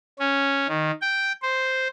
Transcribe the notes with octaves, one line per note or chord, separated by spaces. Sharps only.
C#4
D#3
G5
C5